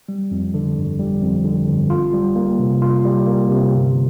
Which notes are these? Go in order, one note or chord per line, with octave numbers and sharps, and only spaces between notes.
G3
F2
D3
G1
G3
F2
D3
G1
F4
G3
A#3
C3
F4
G3
A#3
C3
G1